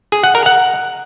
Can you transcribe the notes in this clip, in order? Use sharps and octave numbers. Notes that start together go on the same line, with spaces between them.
G#4
F#5
A#4
F#5